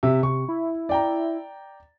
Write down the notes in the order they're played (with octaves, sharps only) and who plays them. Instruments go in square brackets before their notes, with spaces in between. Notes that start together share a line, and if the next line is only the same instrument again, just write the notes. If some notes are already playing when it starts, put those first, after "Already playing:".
[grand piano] C3 [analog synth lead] E5
[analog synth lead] C3 [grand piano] C#6
[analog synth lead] E4
[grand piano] D5 G5 A#5